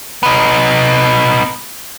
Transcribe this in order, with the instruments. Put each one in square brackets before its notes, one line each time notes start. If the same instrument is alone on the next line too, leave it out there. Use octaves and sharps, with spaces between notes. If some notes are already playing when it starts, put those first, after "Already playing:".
[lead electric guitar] B3 D#4